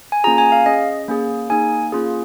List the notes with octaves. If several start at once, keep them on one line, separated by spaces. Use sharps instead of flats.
G#5
A#3 C#4 F4 G#4 A#5
G#5
F5
C#4 G#4 D#5
A#3 C#4 G#4
A#3 D#4 G#4 G#5
A#3 C#4 F4 G#4